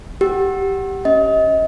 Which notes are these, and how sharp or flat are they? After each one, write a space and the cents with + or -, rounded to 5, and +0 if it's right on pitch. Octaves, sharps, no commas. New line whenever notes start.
G4 +0 F#5 +10 E6 +0
C#4 +0 D#5 +30